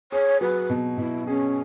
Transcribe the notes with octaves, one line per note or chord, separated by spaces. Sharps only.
G#4 C#5
F#3 B4
B2
B2 E4
C#4 G#4